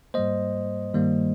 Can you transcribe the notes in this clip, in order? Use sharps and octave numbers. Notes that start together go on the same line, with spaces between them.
G#2 G3 A#3 C5 D#5
G2 D#3 G3 A#3